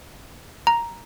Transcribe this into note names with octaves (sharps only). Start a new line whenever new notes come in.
A#5